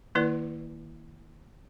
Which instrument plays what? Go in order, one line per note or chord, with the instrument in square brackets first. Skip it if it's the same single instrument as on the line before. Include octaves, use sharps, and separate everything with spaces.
[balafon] D#3 A#3 E4 B4 D5